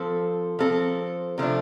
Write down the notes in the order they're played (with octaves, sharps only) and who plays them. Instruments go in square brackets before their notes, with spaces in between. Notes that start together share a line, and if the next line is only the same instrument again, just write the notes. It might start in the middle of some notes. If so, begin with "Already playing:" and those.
Already playing: [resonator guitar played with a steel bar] F3 C4 A4
F3 C4 A4
C3 F3 A3 D4